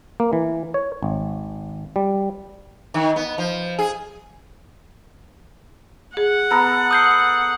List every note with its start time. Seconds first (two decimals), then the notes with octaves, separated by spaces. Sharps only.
0.20 A#3
0.33 E3
0.74 C#5
1.03 G#1
1.96 G3
2.94 D#3
3.16 B3
3.38 F3
3.79 G#4
6.17 G#4 F#5
6.50 B3 A4 A#5
6.91 D#6 G6 C7